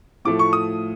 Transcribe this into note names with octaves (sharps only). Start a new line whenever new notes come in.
A2 F3 A3 D6
C#6
D#6